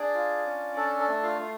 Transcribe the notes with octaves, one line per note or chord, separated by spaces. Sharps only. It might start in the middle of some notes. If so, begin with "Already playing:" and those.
Already playing: D4 G#4 D5
F4
C#4
D4 A4
A4
A3
F4 F5
A3